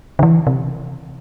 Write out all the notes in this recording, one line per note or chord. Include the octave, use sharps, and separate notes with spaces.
D3
E3
C3